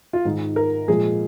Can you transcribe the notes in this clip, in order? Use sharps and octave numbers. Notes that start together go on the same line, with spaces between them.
F4
G#2 D#3 G#3 D#4
A#4
A#2 F3 G#3 G#4